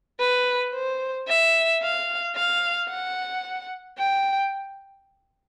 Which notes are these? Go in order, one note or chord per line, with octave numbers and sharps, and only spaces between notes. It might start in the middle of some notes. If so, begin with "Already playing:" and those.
B4
C5
E5
F5
F5
F#5
G5